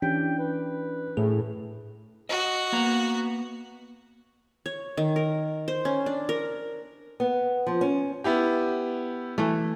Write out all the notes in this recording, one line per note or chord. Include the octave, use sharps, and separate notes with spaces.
E3 C#4 D4 G4 G5
B4
A2 A3 G#4
F#4 D#5
A#3 B3 A#5
C#5
D#3
A#4
C5
C#4
D4
A#4
B3
F3
C#4
B3 E4 G4
E3 A3